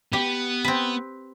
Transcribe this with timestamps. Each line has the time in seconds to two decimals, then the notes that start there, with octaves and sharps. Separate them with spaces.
0.13 B3 G4
0.64 C4 B4